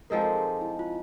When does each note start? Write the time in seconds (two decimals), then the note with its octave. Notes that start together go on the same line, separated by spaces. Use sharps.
0.10 F3 G#3 C4 D#4 A#4
0.21 A4
0.33 G#4
0.61 E4
0.79 F4